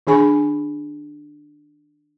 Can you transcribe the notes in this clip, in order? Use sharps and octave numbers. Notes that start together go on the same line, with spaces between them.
D#3 D4 G#4 G#5 B5 C#6